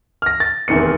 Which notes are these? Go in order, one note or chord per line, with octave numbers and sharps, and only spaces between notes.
F6 A#6
A6
F1 E2 D#3 C4 C#7